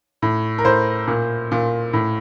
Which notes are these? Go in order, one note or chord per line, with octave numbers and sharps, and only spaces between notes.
A2
A#4
A2 C5
A#2
A#2
A2